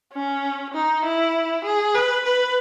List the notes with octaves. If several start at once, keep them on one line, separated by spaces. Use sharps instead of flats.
C#4
D#4
E4
G#4
B4
B4